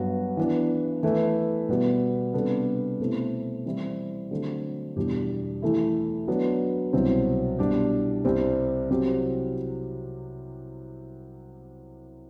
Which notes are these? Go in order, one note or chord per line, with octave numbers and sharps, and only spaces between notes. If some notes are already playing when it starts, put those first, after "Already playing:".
Already playing: G2 F#3 B3 F#4
E3 B3 D4
E3 A3 E4 B4
B2 G3 B3 F#4
C3 G3 B3 D4 A4
B2 A3 C4 E4
E3 G3 C4 E4
D3 F#3 A3 C4
E2 B2 G3 D4 G4
E3 A3 E4
F#3 B3 D4
C2 B2 F#3 C4
B2 G3 D4 G4
C2 C3 G3 C4 G4
C3 F#3 C4 G4